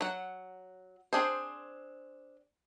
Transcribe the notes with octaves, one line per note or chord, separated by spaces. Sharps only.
F#3 F#5
C4 D4 G#4 C5